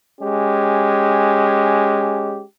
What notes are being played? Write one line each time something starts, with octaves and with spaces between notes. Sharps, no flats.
G#3 C#4 G4